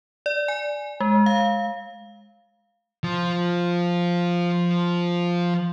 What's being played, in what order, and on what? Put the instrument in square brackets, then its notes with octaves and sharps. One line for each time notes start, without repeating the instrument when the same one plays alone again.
[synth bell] D5
G#5
G#3
F5
[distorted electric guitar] F3 F4